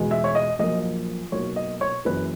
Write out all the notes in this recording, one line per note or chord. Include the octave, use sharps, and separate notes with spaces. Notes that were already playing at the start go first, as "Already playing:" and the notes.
Already playing: E2 B2 G#3
E5
C#5
D#5
A#1 A#2 F#3 A#3 D#5
B1 B2 A#3 C#5
D#5
C#5
F#1 F#2 E3 B4